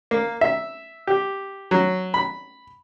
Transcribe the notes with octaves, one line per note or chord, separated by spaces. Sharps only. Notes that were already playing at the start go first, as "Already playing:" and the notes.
A#3
E5
G4
F#3
B5